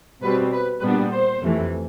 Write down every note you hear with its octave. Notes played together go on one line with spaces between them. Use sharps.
B2 G3 C4 B4
B4
A#2 G3 B3 D4 B4
C5
F2 C3 E3 A3